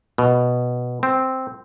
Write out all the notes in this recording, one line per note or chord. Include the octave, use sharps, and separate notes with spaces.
B2
C4